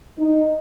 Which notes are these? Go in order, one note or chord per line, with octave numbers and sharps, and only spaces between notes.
D#4